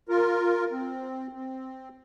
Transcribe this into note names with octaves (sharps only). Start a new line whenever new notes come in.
F4 A#4
C4
C4